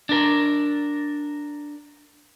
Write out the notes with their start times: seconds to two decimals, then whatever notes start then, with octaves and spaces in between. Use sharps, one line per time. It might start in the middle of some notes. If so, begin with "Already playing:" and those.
0.09 D4 A#4